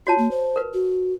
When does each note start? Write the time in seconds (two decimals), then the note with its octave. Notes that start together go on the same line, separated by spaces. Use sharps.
0.07 F4 F#4 C#5 A5
0.18 A#3
0.31 C5
0.56 A#4 B4
0.74 F#4